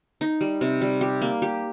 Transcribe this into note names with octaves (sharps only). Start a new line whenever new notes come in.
D#4
G3
C3
G3
G4
A#3
G4